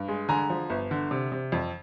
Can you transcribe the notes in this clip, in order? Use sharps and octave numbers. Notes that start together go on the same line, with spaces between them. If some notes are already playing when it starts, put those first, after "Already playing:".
Already playing: G2
G#3
D3 G#5 A#5
F3
G1
D3
C3
C3
F2